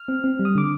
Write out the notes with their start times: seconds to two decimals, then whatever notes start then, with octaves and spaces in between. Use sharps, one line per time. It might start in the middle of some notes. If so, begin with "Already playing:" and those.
Already playing: F6
0.08 C4
0.24 C4
0.39 G3
0.45 D#6
0.55 D3 D6